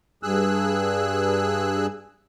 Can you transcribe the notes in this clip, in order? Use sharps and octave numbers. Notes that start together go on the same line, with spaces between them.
G2 G#4 E6 F#6